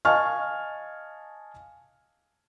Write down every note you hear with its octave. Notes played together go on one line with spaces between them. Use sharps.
D#5 F5 G#5 A5 C#6 F6